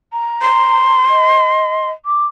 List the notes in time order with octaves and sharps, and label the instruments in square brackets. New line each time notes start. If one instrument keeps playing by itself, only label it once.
[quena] A#5
[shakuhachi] C6
[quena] D#5
D6